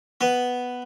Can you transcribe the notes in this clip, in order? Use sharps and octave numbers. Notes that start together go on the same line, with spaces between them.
B3